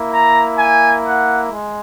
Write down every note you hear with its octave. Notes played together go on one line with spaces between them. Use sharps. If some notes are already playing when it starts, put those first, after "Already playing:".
Already playing: A#3 E4
A#5
G#5
F#5
G#3